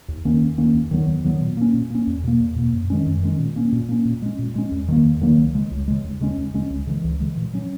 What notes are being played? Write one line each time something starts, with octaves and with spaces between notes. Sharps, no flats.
D#2
D#3 A#3 C#4
D#2
D#3 A#3 C#4
D#2
D#3 F#3 B3
D#2
D#3 F#3 B3
A#2
A#3 C#4
A#2
A#3 C#4
E2
B2 A#3
E2
B2 A#3
F#2
D#3 G#3 C#4
F#2
D#3 G#3 C#4
A#2
A#3 C#4
A#2
A#3 C#4
A#2
G#3 C#4
A#2
G#3 C#4
E2
D#3 F#3 A#3
E2
D#3 F#3 A#3
C#2
C#3 G#3
C#2
C#3 G#3
D#2
C#3 G#3 C#4
D#2
C#3 G#3 C#4
C#2
C#3 E3 G#3
C#2
C#3 E3 G#3
A#2
F#3 C#4